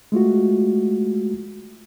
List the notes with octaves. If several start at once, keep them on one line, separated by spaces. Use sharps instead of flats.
G#3 A3 F4 F#4